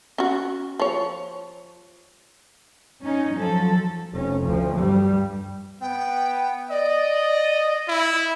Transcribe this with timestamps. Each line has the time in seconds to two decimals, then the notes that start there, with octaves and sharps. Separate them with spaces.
0.18 C#4 F#4
0.79 F3 C#5
3.03 C#4 D#4
3.35 F3 F#3 A4
4.13 F1 C#4
4.46 D2 F3
4.76 G2 G3
5.81 B3 G5
6.70 D5 D#5
7.88 E4